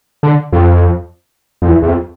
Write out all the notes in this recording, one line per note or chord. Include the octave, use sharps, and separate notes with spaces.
D3
F2
F2
E2
E2
F2